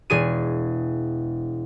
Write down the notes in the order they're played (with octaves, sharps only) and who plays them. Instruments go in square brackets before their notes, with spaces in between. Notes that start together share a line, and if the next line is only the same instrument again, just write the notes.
[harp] E1 G#4 D#7